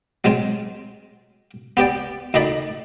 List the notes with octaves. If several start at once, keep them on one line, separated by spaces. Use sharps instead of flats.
F#3 G#3 C4 G#5
B3 G4 D5 G5
D2 D#3 D#4 D5 B5